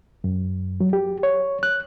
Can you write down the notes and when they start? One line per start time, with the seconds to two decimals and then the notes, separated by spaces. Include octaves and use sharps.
0.24 F#2
0.80 F#3
0.93 G4
1.23 C#5
1.63 F#6